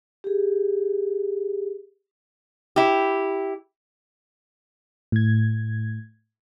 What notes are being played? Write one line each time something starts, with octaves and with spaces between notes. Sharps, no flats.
G4 G#4
E4 G4
A2 G#6